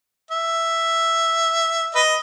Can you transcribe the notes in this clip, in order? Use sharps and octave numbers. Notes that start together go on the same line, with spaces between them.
E5
B4 D#5